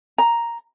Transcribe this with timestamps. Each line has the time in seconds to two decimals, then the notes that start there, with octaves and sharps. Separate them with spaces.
0.18 A#5